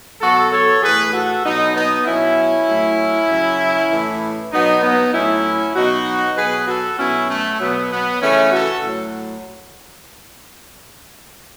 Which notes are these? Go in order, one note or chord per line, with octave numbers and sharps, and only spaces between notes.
B2 F#3 F#4 A4
A4 C#5
A2 E3 G#4 B4
F#4 A4
B2 F#3 B3 D#4
B3 D#4
B2 F#3 C#4 E4
A2 F#3
C#3 F#3
A2 E3
B2 F#3 B3 D#4
B3 D#4
A2 F#3 C#4 E4
B2 F#3 D#4 F#4
B2 F#3 G#4 B4
F#4 A4
B2 F#3 C#4 E4
A3
B2 F#3 B3
B3
C#3 E3 A3 C#4
F#4 A4
A2 F#3